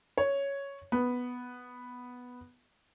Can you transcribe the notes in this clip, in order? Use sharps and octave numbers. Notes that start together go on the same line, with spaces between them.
C#5
B3